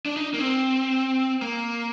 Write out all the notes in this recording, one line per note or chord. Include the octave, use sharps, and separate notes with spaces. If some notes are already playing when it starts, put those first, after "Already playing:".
D4
D#4
A#3
C4
A#3